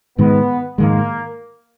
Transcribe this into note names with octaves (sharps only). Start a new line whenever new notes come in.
G#2 D#3 G#3 B3
G#2 D#3 G#3 A#3